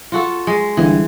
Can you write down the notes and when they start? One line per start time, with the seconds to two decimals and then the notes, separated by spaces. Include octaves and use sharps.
0.12 F4 F#4 A4
0.47 G#3
0.77 G1 E3